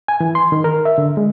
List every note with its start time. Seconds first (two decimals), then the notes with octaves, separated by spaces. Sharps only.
0.08 G#5
0.20 E3
0.35 C6
0.52 D#3
0.64 A#4
0.85 E5
0.98 D3
1.17 G#3